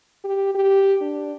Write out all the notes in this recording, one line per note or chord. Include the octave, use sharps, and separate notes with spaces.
G4
G4
D4